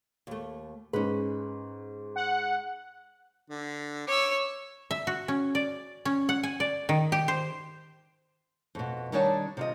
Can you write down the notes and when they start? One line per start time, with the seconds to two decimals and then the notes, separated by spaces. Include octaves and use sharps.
0.27 D#2 A3
0.93 G#2 C#4 B4
2.16 F#5
3.50 D3
4.07 C#5 D6 E6
4.91 E5
5.07 F#4
5.28 C#4
5.55 D5
6.05 C#4
6.29 F#5
6.43 G#5
6.60 D5
6.89 D#3
7.12 G4
7.28 C5
8.75 F2 B2
9.12 D#3 G3 D4 C#5 G5 A5
9.57 C3 F4 D#5